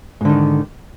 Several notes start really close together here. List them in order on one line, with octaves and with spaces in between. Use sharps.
G#2 D3 D#3